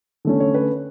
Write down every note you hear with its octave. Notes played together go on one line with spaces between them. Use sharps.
D3 A3 C#4
C#5
B4